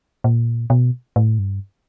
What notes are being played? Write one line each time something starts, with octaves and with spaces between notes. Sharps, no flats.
A#2
B2
A2
G2